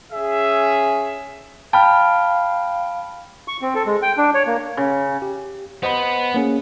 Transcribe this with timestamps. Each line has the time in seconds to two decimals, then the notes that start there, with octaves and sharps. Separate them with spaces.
0.12 C#4 G#4 E5
1.73 F5 G5 A5 B5 F6
3.48 C#6
3.62 C4
3.75 A4
3.86 G#3
4.03 G5
4.18 D4
4.34 C#5
4.47 A#3
4.77 C#3
5.22 G4
5.83 B3 C5 D#5 B5
6.34 A#3 C#4 G#4